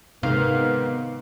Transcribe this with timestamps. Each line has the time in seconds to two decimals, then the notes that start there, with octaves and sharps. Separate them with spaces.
0.23 G#2 C3 D#3 B3 F5